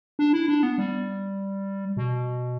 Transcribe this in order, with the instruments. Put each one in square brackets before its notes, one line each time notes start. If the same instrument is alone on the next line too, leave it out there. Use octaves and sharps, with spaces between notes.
[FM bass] D4
E4
D4
B3
G3
B2